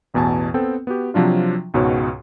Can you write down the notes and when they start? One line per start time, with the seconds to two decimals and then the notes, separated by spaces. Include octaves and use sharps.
0.14 A1 E2 B2 G#5 A5
0.54 B3 C4 A4 G5
0.87 B3 F#4 G4
1.14 C3 F3 F#3 D4 F4
1.74 C#2 G#2 B2 F#4 C#5